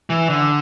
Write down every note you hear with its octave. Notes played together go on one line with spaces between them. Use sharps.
E3
D3